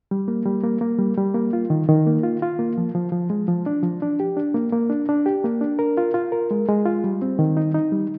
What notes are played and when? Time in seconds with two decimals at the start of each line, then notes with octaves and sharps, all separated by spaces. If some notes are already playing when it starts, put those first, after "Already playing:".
0.11 G3
0.28 A#3
0.46 G3
0.64 A#3
0.81 A#3
0.99 G3
1.18 G3
1.34 A#3
1.53 F4
1.70 D#3
1.88 D#3
2.07 A#3
2.23 F4
2.42 F4
2.59 A#3
2.78 F3
2.94 F3
3.12 F3
3.30 G#3
3.48 F3
3.66 D4
3.83 F3
4.02 D4
4.20 G4
4.37 D4
4.54 A#3
4.72 A#3
4.90 D4
5.09 D4
5.26 G4
5.44 A#3
5.61 D4
5.79 A#4
5.97 F4
6.14 F4
6.32 A#4
6.51 G#3
6.69 G#3
6.86 F4
7.04 G3
7.22 C4
7.39 D#3
7.57 D#4
7.74 D#4
7.92 G3